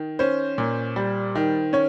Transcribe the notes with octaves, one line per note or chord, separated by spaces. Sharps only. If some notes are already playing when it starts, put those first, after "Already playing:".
Already playing: D#3
C#4 C5
A#2
G3
D#3
C#4 C#5